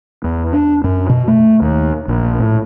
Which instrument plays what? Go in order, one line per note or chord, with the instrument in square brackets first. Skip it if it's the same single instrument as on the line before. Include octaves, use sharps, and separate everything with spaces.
[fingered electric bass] E2
D4
F#2
B2
A3
D#2
A#1
A2